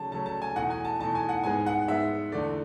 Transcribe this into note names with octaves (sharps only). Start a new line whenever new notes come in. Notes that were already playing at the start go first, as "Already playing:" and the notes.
Already playing: C#3 F#3 A3 A5
C#3 F#3 A3 A5
A5
G#5
E2 B2 A3 F#5
G#5
A5
E2 B2 A3 A5
G#5
F#5
G#2 G#3 B3 G#5
F#5
G#2 G#3 B3 E5
E2 D3 A3 D5